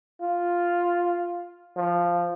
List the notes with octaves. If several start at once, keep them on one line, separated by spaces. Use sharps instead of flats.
F4
F3